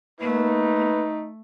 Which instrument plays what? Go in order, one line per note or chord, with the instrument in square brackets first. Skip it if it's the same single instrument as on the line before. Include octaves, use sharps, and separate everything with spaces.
[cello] A3 [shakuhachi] A#3 [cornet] D#4 [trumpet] B4